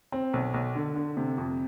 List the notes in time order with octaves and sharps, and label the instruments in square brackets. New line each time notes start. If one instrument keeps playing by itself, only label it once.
[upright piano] C4
B1
B1
D3
D3
C3
F2